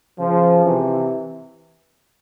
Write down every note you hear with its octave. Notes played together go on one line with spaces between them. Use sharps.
C#3 F3
C3 E3